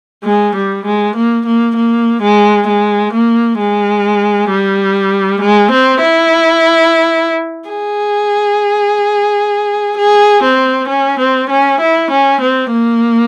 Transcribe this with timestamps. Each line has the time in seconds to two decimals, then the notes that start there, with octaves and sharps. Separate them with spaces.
0.24 G#3
0.55 G3
0.86 G#3
1.16 A#3
1.46 A#3
1.77 A#3
2.22 G#3
2.68 G#3
3.13 A#3
3.59 G#3
4.50 G3
5.41 G#3
5.71 C4
6.02 E4
7.69 G#4
9.97 G#4
10.43 C4
10.88 C#4
11.19 C4
11.50 C#4
11.80 E4
12.11 C#4
12.41 C4
12.71 A#3